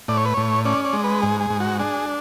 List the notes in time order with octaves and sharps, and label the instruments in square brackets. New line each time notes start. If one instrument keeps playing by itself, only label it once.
[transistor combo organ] A2 D5
C#5
B4
A2 C#5
C#4 D5
D5
G#3
B4
G#2 G#4
G#4
G#2
F#4
D4 G#4